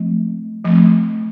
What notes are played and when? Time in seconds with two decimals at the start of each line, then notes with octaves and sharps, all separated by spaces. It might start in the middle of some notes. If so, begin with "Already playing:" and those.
Already playing: F3 A3 C4
0.65 F3 A3 C4